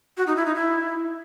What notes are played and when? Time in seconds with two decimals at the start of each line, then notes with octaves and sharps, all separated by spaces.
0.17 F#4
0.27 D#4
0.36 E4
0.46 D#4
0.55 E4